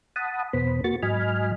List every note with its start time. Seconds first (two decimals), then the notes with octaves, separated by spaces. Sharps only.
0.16 F#5 A5 B5 D#6
0.53 E2 B2 B3 C5 B5
0.84 A#3 F#4 C#6 A6
1.03 G#2 F#3 D#5 G#5 B5 F6